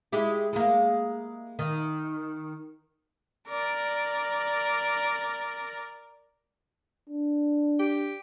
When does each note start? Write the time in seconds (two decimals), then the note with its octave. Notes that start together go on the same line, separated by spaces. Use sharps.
0.12 G#3 E4 G4
0.53 G#3 A#3
1.59 D#3
3.48 A#4 D5
7.09 D4
7.79 G4